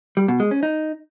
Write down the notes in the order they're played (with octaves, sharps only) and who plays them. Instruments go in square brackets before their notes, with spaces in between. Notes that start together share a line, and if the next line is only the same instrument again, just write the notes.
[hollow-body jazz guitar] G3
B2
G#3
C#4
D#4